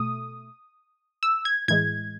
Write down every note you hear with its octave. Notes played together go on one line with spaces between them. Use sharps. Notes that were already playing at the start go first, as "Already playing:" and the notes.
Already playing: B2 A3 D#6
E6
G#6
A2 E3 G#3 G#6